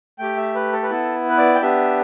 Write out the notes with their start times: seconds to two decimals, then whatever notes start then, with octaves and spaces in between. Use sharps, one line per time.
0.19 A3 G4 G5
0.37 E5
0.55 B4
0.73 A4
0.83 B4
0.90 B3 E4 A4
1.29 B4
1.38 D5
1.55 G5
1.61 B3 D4 G4 E5